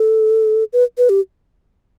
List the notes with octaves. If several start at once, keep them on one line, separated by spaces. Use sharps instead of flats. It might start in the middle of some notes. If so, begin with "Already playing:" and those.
Already playing: A4
B4
B4
G4